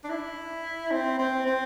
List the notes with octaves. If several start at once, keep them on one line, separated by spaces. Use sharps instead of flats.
D4
E4
C4
C4
C4